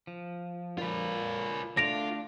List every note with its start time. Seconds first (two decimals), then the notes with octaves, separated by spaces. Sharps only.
0.07 F3
0.78 A#2 F4 B4
1.77 D3 A3 D4 F4 A#6 D7 F7